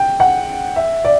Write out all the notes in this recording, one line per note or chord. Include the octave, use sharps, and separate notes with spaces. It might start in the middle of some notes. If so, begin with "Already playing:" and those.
Already playing: G5
F#5
E5
D5